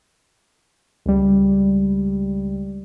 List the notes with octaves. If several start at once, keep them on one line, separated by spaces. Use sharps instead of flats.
C#2 G3